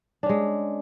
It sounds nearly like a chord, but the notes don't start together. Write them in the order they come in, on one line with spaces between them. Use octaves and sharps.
D4 C#4 G#3